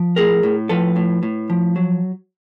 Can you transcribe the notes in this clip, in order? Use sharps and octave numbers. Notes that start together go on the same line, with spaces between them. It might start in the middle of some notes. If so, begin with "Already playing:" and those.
Already playing: F3
A2 G#4 A#4
A2
F3 A4 B4
A2
A2
F3
F#3